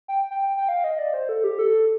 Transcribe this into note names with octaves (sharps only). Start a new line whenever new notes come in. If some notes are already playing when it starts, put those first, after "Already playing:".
G5
G5
G5
F5
D#5
D5
C5
A4
G4
A4